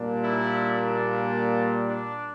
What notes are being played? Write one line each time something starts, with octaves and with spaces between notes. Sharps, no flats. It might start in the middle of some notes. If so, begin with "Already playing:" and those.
Already playing: A#2 G3 A#3 D4
E4
D4